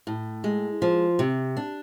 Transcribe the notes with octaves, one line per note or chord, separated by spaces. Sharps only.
A2
G#3
F3
C3
D4